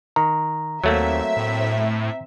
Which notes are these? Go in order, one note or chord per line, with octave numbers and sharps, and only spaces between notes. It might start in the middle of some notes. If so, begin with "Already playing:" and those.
D#3 A#5
D#2 F#3 A3 A#3 C4 E5
A2